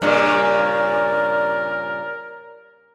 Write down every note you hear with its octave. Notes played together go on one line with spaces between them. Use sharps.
G2 A#2 C#3 A#4 D5